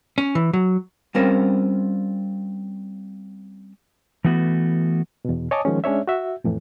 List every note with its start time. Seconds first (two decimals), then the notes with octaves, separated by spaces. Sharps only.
0.18 C#4
0.35 E3
0.53 F#3
1.15 G3 C4 C#4 F4 A#4 C5
4.25 E3 A3 B3 F#4
5.25 E2 B2
5.51 C#5 D#5 G#5 A5 D6 D#6
5.65 D#3 F3 G#3 C#4
5.84 G#3 C#4 D4 C#5 E5
6.07 F#4 E5
6.44 F2 A2 E3